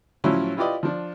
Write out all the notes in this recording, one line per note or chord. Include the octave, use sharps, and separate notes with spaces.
A2 F3 F#3 C#4 E4 F4
E4 F4 G4 B4 D5 D#5
F3 D4